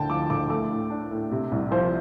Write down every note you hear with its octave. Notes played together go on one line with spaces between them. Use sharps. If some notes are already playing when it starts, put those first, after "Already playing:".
Already playing: D2 D3 G5 A5
F3 D6
D2 D6
A3 D6
A2
D4
A2
C3
C2
F3 C5